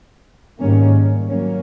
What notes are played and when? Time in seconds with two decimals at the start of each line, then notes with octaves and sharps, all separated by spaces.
0.60 G#2 D#3 G3 A#3 C#4
1.28 F#3 A#3 C#4